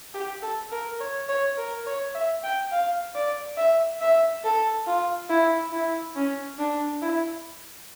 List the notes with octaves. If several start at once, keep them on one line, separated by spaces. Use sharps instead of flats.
G4
A4
A#4
C#5
C#5
A#4
C#5
E5
G5
F5
D5
E5
E5
A4
F4
E4
E4
C#4
D4
E4